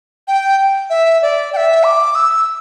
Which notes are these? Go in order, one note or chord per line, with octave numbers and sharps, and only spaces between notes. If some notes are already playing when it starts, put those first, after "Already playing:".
G5
E5
D5
G5
E5
D6
E6